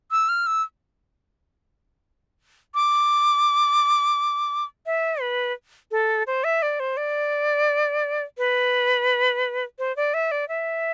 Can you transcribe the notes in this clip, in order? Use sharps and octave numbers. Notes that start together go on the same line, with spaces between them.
E6
F6
E6
D6
E5
B4
A4
C5
E5
D5
C5
D5
B4
C5
D5
E5
D5
E5